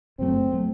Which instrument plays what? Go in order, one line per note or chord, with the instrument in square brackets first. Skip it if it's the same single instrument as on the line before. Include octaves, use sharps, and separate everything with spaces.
[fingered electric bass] F#1 F#2 F#3 A3 [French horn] C4
[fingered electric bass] F#3 A3